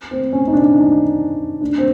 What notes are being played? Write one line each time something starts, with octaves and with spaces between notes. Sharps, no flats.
C4
C#4
D#4
D4
D#4
D4
C4